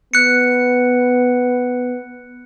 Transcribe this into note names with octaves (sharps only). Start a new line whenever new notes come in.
B3 F#6 C#7